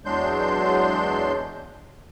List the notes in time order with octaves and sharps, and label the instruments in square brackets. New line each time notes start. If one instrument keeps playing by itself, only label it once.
[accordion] E2 F#3 G#3 D4 C6 G6